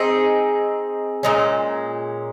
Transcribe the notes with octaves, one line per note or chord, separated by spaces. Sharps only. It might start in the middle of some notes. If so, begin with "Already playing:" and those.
Already playing: C4 D#4 G#4
A#2 G#3 C#4